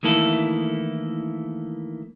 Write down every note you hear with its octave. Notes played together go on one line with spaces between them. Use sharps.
D#3 E3 A3 A#3 E4 A4